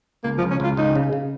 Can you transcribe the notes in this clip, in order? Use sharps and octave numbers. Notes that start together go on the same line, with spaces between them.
C#2 A#3
F3
C#2
C#4
C#2 F4
C#2 D#4
C#3
C#3